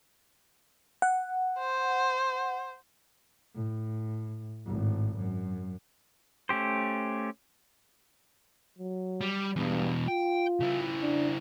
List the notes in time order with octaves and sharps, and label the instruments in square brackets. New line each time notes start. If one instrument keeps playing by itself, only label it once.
[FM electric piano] F#5
[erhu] C5
[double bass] A2
G#1 A2
F#2
[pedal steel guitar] A3 C#4 G4 C5
[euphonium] F#3
[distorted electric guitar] G3
[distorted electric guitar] E2 B2 [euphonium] G2
[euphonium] F4 [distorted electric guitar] G5
[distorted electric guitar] C#3 E4
[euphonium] D4